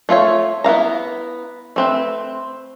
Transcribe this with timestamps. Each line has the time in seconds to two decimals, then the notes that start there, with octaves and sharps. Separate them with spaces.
0.09 A3 F4 A4 C#5
0.64 B3 E4 F5 A#5
1.76 A3 C4 B4